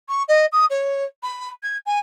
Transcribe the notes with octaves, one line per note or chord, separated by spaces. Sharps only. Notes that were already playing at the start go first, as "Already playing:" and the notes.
C#6
D#5
D#6
C#5
B5
G#6
G#5